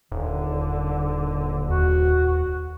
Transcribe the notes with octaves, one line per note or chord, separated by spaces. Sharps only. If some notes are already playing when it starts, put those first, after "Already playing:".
D#1 D3
D#2 F#4